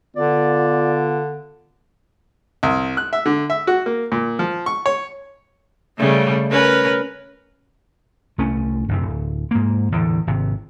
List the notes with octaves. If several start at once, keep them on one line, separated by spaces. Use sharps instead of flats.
D3 B3 F4 D5
C2
F#6
E5
D3
E5
F#4
A#3
A#2
F3
C#6
C#5
C#3 G3 A3
C#4 A#4 B4
C2 A3 C#4
G1 F#2 C3
D1
G#2 A#3
E2 A2 D3
G#1 C3